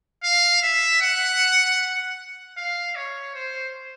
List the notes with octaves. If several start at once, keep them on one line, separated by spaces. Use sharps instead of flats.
F5
E5
F#5
F5
C#5
C5